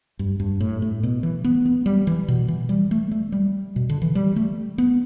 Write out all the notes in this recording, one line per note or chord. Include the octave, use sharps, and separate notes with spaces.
G2
G2
A2
A2
B2
E3
B3
B3
G3
E3
B2
E3
G3
A3
A3
G3
B2
D3
E3
G3
A3
B3